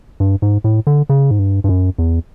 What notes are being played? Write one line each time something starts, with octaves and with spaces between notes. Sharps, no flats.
G2
G#2
A2
D3
C#3
G#2
G2
G2
F#2
E2